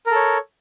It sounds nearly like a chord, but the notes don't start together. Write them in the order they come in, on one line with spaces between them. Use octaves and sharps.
A#4 A4 C#5